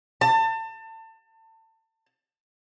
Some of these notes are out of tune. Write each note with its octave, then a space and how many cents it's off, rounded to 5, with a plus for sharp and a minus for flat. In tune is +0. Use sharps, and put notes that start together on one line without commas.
A5 +30